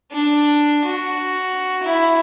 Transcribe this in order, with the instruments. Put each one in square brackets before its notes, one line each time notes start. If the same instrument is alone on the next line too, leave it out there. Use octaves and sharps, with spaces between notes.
[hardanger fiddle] D4
F#4
E4